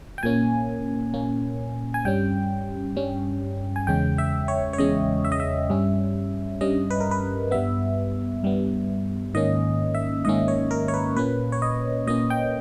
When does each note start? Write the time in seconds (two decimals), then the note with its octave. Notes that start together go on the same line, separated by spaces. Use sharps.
0.18 G5
0.23 A#2 A#3 C#4 G#5
1.14 A#2 A#3 C#4
1.94 G#5
2.05 G2 G3 C#4 G5
2.96 G2 G3 C#4
3.76 G#5
3.87 E2 C#3 G#3 C#4 G5
4.18 E5
4.48 C#5
4.73 C#5
4.78 E2 C#3 G#3 C#4 D#5
5.25 E5
5.32 D#5
5.40 E5
5.70 G2 G3 C#4
6.61 G2 G3 C#4 D#5
6.91 B4
7.00 A#4
7.11 B4
7.51 G2 G3 B3 E5
8.43 G2 G3 B3
9.34 G#2 D#3 A#3 C#4 D#5
9.95 E5
10.25 G#2 D#3 A#3 C#4 D#5
10.48 C#5
10.71 A#4
10.88 C#5
10.94 B4
11.16 A#2 A#3 C#4 B4
11.52 C#5
11.62 D#5
12.07 A#2 A#3 C#4 D#5
12.30 G5